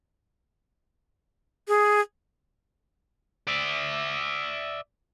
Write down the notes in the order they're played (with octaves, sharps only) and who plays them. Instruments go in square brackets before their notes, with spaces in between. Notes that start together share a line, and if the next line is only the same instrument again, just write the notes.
[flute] G#4
[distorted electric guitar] D5 E5